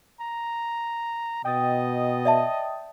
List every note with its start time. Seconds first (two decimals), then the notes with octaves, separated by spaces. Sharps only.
0.20 A#5
1.45 B2 D#5 G5 D#6 A6
2.25 D5 E5 A5